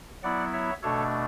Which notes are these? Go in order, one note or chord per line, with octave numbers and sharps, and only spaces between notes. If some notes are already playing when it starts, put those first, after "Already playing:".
F#3 B3 E4 D5 F#5
C#5 E5
B2 A3 D4 A4 C#5